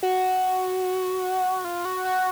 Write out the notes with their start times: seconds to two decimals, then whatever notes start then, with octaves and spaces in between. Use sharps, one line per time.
0.03 F#4
1.65 F4
1.85 F#4
2.05 F#4